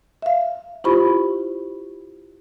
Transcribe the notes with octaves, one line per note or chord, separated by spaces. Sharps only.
E5 F5
E4 F4 G4 C5 B5 C#6